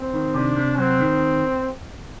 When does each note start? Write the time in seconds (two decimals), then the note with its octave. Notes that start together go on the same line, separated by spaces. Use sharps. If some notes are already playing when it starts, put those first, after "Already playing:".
Already playing: C4
0.13 D#3
0.34 C3 D4
0.56 C3
0.78 F#3 C4
1.00 D#3